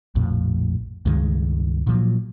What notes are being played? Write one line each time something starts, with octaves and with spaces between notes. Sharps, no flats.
A#1 F2 A2
C#2 G2 D#3 G#3
A#2 F3 F#3